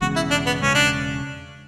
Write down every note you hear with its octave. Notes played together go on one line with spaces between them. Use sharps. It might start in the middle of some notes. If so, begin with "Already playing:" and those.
E1 E2 C#3 G#3 F#4
E4
D4
B3
E1 E2 C#3 G#3 C#4
D4